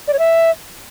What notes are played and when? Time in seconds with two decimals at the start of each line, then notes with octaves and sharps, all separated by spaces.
0.08 D5
0.13 C#5
0.19 E5